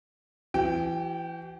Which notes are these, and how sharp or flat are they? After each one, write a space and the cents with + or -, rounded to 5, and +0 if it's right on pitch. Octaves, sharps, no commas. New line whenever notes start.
E3 +35 G4 -45 G5 +0